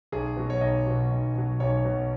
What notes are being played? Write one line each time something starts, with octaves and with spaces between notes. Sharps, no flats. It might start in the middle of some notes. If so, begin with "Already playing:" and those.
B1 G#4
B2 F#3
C#5
B1 D#5
B2 F#3
B1
B2 F#3
B1 C#5
C#5
B2 F#3